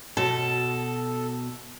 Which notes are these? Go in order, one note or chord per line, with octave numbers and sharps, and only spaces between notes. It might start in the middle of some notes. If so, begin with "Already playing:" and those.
B2 F#4 A4 C#5